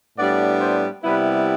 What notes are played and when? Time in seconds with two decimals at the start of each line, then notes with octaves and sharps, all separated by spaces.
0.17 A2 G3 B3 D4 D5
0.60 C5
1.04 C3 G3 B3 E4 B4